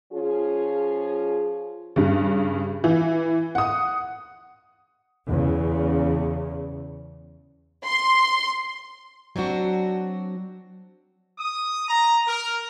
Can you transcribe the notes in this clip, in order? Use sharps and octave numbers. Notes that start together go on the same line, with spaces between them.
F3 C#4 F4 G#4
G2 C#3
E3
F#5 D#6
E2 C#3
C6
F#3 C4 D4 F#4
D#6
A#5
A#4